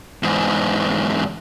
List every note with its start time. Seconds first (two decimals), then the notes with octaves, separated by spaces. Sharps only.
0.23 E2 G#2